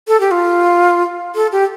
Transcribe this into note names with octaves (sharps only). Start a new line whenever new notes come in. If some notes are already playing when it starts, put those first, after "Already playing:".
A4
G4
F4
A4
G4